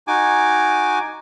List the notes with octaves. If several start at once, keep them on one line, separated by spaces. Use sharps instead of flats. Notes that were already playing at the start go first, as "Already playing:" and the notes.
D#4 F#4 G#5 D6